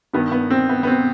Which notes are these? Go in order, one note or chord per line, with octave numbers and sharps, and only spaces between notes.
G2 D#3 B3
B3
C4
B3
B3
C4